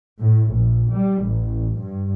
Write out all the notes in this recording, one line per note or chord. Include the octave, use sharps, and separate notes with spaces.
A2
A#1
G3
A1
G2